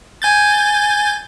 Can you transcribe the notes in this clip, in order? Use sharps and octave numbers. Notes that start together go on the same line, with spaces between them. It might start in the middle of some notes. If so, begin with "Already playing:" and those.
G#5 G6 A6